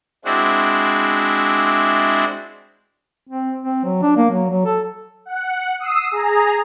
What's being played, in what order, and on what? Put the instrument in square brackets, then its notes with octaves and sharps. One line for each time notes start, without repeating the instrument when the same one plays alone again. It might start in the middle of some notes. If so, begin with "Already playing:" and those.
[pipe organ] G#3 C4 D4 E4 F#4
[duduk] C4
C4
F#3
D4
A#3
F#3
F#3
A4
[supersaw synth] F#5
D#6 E6 C7
G#4 A#5